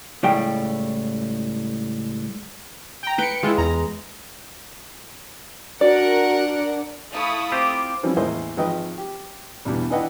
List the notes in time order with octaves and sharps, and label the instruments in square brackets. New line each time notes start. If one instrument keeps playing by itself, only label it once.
[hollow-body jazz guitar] C#2 A2 G3 G5
[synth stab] G5 A#5
[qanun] B4 G5 [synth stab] C#7 D7
[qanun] G#3 [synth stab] E4 F4
[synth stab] E2 A#5
[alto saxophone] D4 [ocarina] F#4 [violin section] A#4 F#5 [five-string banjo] D5
[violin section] A3 E4 D#6 [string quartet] F5 C#6
[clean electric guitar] C4 F4 G4 [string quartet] D6
[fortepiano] E3 F3 G3 C4 C#4 F4
A1 E2 G#3 A#3 C5 D#5
G#1 F3 B4 D#5 G5 D#6
G4
E2 G2 B2 G3
E3 D4 B4 D#5 F#5 G5